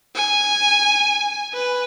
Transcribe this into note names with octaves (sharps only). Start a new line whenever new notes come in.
G#5
B4